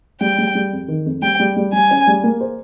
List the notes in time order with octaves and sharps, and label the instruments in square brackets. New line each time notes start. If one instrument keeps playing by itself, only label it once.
[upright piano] G3 [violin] G5
[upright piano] G3
G3
F2
D#3
F2
[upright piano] G3 [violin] G5
[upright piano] G3
G3
[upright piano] G3 [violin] G#5
[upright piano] C#4
G3
A#3
C5